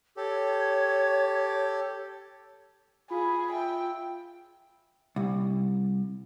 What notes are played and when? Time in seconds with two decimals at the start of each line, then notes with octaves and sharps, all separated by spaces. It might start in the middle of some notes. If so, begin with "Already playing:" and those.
0.17 G4 A4 C#5
3.10 F4 G#4 B5
3.52 E5 G5
5.16 C2